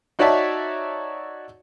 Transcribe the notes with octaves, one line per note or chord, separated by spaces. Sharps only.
D#4 F#4 C#5 D5 E5 A5